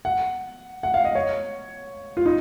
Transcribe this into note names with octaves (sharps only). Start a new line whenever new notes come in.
F#5
F#5
F5
D#5
C#5
F4
D#4